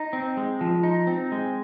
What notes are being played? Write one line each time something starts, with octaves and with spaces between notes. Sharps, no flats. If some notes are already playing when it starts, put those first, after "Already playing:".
Already playing: D#4
C4
G#3
F3
D#4
C4
G#3